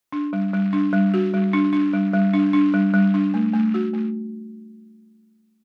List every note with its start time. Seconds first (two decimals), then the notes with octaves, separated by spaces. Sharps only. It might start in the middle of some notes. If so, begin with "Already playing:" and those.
0.12 D4
0.33 G3
0.54 G3
0.73 D4
0.93 G3
1.14 F#4
1.34 G3
1.53 D4
1.73 D4
1.93 G3
2.13 G3
2.34 D4
2.53 D4
2.74 G3
2.94 G3
3.14 D4
3.34 A3
3.53 A3
3.74 F#4
3.94 A3